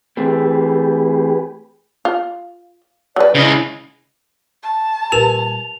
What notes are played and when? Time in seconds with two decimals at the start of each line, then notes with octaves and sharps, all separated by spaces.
0.17 E3 A3 C4 G4 G#4 B4
2.05 F4
3.16 F#3 B4 D5
3.35 C#3 E4 D#5
4.63 A5
5.12 A#2 G3 G4 A#4 B4 F7